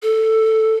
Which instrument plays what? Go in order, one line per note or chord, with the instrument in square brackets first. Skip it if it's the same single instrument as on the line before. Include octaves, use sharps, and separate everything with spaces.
[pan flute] A4